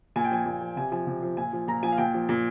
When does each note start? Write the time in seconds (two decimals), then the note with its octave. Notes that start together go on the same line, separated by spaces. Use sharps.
0.16 A#2 G#5
0.24 G5
0.31 F3 G#5
0.46 A#2
0.61 F3
0.76 C3 G#5
0.91 F3 G#5
1.07 C3
1.22 F3
1.37 A#2 G#5
1.53 F3
1.68 A#2 A#5
1.82 F3 G#5
1.92 F5
1.98 A#2 G5
2.14 F3
2.29 A#2